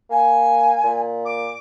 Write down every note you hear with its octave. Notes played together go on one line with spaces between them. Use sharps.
A#3 G#5
A#2
D6